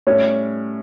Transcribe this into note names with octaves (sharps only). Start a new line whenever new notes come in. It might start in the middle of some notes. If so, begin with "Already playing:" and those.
A2 G3 C#4 C#5